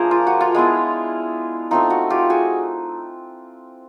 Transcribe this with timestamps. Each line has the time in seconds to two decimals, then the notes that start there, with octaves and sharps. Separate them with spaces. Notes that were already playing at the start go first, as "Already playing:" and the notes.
Already playing: F3 A3 D4 G#4 A#4 C5
0.11 F4
0.27 F#4
0.41 F4
0.54 G#3 B3 E4
1.71 A3 C4 D#4 F4
1.90 F#4
2.10 F4 G4
2.30 F#4 G#4